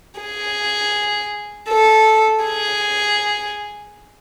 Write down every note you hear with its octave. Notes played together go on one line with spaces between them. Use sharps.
G#4
A4
G#4